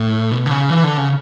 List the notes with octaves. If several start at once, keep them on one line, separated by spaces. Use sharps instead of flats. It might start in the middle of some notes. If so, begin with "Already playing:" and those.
Already playing: A2
B2
D3
C#3
E3
D3
C#3